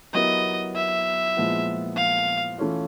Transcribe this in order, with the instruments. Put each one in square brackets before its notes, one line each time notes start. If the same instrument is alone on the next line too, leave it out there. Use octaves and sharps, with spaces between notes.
[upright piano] F#3 B3 E4 G4 A#4 [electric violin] D#5
[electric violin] E5
[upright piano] A#2 F3 G#3 B3 E4
[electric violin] F5
[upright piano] E3 A3 C#4 F4